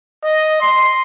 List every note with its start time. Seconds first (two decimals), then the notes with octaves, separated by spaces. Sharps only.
0.24 D#5
0.61 C6